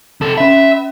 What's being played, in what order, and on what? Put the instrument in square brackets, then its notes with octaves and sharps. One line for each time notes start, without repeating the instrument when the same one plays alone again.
[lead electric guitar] C3 A4
[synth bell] C#4 B5 [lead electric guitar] E5